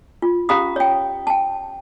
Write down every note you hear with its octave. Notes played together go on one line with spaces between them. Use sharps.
F4
C#4 G4 F5 A#5 B5 D#6
C#5 G5
G5 A5